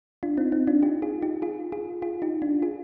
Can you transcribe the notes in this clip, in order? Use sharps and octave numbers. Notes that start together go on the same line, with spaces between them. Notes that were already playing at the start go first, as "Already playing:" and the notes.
D4 F4
C4 D#4
C4 D#4
D4 F4
D#4 G4
F4 G#4
D#4 G4
F4 G#4
F4 G#4
F4 G#4
D#4 G4
D4 F4
F4 G#4